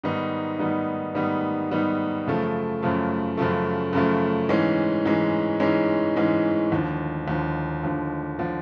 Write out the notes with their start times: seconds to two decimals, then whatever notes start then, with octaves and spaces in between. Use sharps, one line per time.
0.04 G#2 D#3 G3 B3 D#4
0.59 G#2 D#3 G3 B3 D#4
1.14 G#2 D#3 G3 B3 D#4
1.71 G#2 D#3 G3 B3 D#4
2.26 F#2 C#3 F3 A3
2.83 F#2 C#3 F3 A3
3.37 F#2 C#3 F3 A3
3.93 F#2 C#3 F3 A3
4.49 G#2 E3 G#3 C#4
5.05 G#2 E3 G#3 C#4
5.60 G#2 E3 G#3 C#4
6.16 G#2 E3 G#3 C#4
6.72 D#2 D3 F3
7.28 D#2 D3 F3
7.83 D#2 D3 F3
8.39 D3 F3